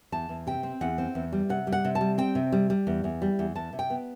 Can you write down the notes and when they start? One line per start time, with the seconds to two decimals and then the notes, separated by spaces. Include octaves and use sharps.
0.12 E2 A5
0.29 E2
0.47 C3 G5
0.63 C4
0.81 E2 F#5
0.98 C4
1.15 E2
1.32 G3
1.49 C3 F#5
1.67 G3
1.72 F#5
1.85 C3
1.95 A5
2.01 G3
2.18 C4 G5
2.35 C3
2.52 G3
2.70 G3
2.87 E2
3.04 E2
3.22 G3
3.39 E2
3.55 E2 A5
3.73 C3
3.79 G5
3.90 B3